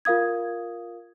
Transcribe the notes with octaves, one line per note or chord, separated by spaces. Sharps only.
F4 A#4 F5 D#6 G#6